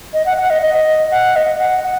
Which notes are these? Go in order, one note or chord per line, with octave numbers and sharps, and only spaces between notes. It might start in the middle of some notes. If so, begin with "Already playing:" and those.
D#5
F#5
F#5
D#5
D#5
F#5
D#5
F#5
F#5